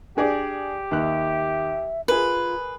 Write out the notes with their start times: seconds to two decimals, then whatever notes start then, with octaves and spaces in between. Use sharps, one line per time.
0.17 D4 G4 G#4 D5
0.91 D#2 E5 F#6
2.08 F4 G#4 A#4 B4